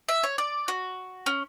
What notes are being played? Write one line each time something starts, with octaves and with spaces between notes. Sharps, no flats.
E5
C#5
D5
F#4
C#4